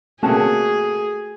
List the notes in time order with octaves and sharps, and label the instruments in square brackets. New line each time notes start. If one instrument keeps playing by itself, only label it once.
[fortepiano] C3 A#3 C#4 [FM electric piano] A3 [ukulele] F#4 A5 [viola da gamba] G#4